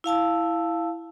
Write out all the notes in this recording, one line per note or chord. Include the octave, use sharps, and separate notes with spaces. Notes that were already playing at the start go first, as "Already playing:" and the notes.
E4 F5 A5 E6